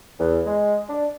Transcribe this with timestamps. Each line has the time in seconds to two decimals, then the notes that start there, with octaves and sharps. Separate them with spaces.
0.19 E2
0.46 G#3
0.90 D4